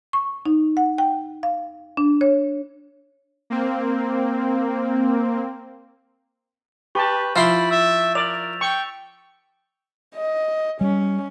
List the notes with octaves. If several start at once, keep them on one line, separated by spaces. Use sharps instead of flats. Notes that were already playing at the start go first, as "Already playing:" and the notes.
C#6
D#4
F#5
G5
F5
D4
C#5
A#3 C4
G4 B4 A5 C#6 G6
F3 E4 F5 B5 C6 A6 B6 D7
E5 E6 A6 E7
A#4 D5 F7
G5 C#6
D#5
G3 C#4